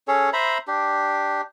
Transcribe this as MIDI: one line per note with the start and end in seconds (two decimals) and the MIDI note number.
0.08 0.30 61
0.08 0.30 68
0.08 0.30 69
0.08 0.30 73
0.33 0.58 72
0.33 0.58 76
0.33 0.58 82
0.33 0.58 83
0.68 1.41 62
0.68 1.41 67